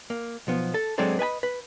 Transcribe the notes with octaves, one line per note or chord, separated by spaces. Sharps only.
A#3
B1 F3 B3
A4
F#3 G#3 C4 D4 A4 C5
B4 D#5 G#5 B5
B4